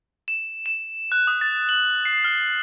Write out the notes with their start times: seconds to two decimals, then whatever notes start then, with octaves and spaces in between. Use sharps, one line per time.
0.28 E7
0.66 E7
1.12 F#6
1.27 D#6
1.41 A6
1.69 F#7
2.05 C7
2.24 F6